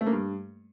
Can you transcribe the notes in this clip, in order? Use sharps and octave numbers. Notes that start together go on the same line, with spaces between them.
A3
A#3
G2